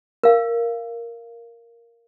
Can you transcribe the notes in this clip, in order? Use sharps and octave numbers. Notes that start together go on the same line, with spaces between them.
A#4 F5